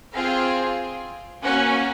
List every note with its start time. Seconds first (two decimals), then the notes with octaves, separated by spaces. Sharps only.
0.14 C4 F4 G#4 F5
1.44 A#3 C#4 F#4 F#5